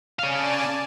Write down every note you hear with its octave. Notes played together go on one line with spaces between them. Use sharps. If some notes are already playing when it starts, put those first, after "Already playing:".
C#4 D5 F5 G#5 A5